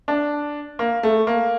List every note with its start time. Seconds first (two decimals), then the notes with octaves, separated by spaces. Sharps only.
0.08 D4
0.79 A#3
1.03 A3
1.27 A#3